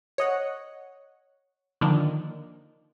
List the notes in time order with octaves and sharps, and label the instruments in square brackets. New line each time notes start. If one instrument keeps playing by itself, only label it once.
[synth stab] C#5 D#5 F#5
D3 D#3 F3 A#3 D4 D#4